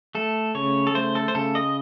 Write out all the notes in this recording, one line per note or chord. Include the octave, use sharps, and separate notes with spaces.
A3 A4
C#3 C#5
A4
A3 C5
A4
C5
C#3 A4
D#5